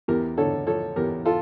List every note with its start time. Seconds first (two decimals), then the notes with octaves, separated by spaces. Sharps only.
0.08 E2 G4 A#4
0.37 D3 A4 C#5
0.67 F3 A4 C#5
0.96 E2 G4 A#4
1.26 F4 A4